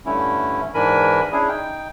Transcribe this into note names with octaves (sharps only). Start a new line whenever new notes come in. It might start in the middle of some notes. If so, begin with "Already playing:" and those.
G2 D3 A3 C#4 E4
G#2 E3 D4 A#4 G#5 B5
C#4 D4 E4 G#4
D#4 G5